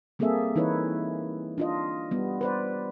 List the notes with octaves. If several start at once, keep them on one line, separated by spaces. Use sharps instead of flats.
G3 A#3 C4 G#4 A4 E5
E3 D#4 E4 B4 C#5
D4 F4 D#5
G3 B3
B4 C5 D5